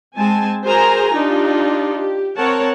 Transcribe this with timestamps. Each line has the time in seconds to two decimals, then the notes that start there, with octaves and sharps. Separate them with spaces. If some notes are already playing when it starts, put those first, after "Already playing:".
0.16 G#3 C4 G#5 A5
0.65 F#4 G#4 A#4 C5 G#5 A#5
1.13 D4 D#4 F4 G4
1.97 G4
2.36 C4 A#4 C#5 F#5 A5